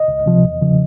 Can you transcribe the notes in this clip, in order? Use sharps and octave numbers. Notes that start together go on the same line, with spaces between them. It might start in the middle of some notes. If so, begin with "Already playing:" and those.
Already playing: D#5
C#2
C3 F3
E2
C#3 F3